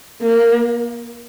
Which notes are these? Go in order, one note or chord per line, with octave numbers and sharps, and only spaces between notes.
A#3